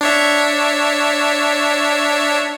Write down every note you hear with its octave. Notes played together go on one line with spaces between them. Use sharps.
D4 C#5 E5